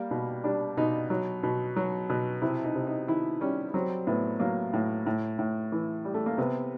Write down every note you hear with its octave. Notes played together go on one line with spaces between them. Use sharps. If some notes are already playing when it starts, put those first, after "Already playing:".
Already playing: G3 A#3
B2
G3 D4
B2 D#4
F#3
B2
F#3
B2
C3 E4
D#4
C3
D#4
D#3 E4
G3 C#4
F#3 C4
A2 B3
F#3 A#3
A2
A2
A2
E3
G3
A3
A#3
C3 B3